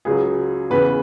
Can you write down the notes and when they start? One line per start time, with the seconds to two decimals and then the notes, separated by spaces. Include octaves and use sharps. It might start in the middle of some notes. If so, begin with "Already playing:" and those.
0.05 C#2 C#3 F#3 G#4
0.70 E2 C#3 E3 B4